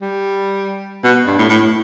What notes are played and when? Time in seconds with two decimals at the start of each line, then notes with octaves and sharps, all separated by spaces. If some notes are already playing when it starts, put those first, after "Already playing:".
0.02 G3
1.04 B2
1.26 G2
1.38 A2
1.49 A2